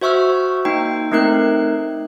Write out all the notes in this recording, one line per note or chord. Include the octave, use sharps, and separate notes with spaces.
F#4 C5 E5 C#6 E6 F6
A#3 D#4 G5
A3 C4 D#4 A#4 F#6